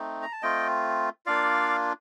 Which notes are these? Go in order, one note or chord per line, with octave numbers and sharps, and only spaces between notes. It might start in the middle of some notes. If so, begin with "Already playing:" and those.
Already playing: A3 C4 D#4
A#5
A5
A3 C4 F4 D#5 G5
A#3 D4 F4 D5 F5